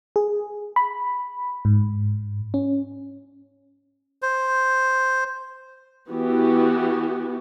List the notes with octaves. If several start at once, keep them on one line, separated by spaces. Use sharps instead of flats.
G#4
B5
G#2
C#4
C5
E3 B3 F#4 G4